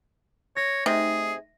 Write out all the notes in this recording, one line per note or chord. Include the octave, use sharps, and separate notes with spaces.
C#5 A#6
C3 A3 D#4 G#4 D#5